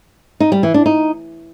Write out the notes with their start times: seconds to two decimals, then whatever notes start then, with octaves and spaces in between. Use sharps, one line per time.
0.40 D#4
0.52 G3
0.63 E3
0.74 D4
0.86 D#4